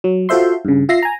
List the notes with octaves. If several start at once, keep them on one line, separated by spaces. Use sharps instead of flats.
F#3
F4 F#4 A4 C5 E5 C6
G2 C#3
F4 E5 A#6 C7
G#5 A#5